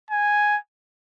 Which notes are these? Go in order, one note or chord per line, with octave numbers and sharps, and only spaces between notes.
G#5